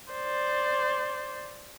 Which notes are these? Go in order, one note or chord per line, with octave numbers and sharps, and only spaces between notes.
C5 D5